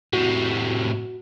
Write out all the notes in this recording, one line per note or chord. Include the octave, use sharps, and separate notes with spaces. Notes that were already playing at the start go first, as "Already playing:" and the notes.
A2 C3 F#4